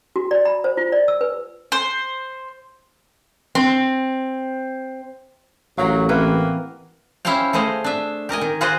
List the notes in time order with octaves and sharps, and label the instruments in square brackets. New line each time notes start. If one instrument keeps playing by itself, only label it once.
[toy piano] F#4
D5
B5
C5
F4
D5
E6
B4
[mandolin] C5
[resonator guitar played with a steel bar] C4
[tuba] A1 [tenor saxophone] F#3 [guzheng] F#4 A#4 G5 [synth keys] F5
[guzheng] E3 [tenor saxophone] A#3 [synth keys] C4 B4 F#5
[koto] C#4 E4 G4 C5 F5 G5
A3 G#4 C5 D#5 F5
D4 E5
G4 A#4 D#5 G#5
D#3
F4 F#4 G#4 C5 D#5